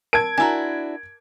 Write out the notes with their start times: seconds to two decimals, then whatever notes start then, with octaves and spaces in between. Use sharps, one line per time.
0.13 A#4 A5 G#6 D7
0.38 D4 E4 F#4 G#5 A#5